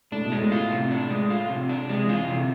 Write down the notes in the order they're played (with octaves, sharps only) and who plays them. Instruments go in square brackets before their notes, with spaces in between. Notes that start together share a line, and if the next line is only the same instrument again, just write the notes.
[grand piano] A2 [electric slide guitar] D4
[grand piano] B2
[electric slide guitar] G#3
[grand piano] A2
[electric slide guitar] F4
C3
D4
G#3
F4
C3
D4
[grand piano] C3 [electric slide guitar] G#3
[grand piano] E3
[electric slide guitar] F4
[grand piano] E3
[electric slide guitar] C3
[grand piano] D3